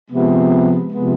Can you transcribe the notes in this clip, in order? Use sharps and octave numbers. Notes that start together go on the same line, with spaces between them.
C3 F3 G#3 B3
C3 F3 G#3 B3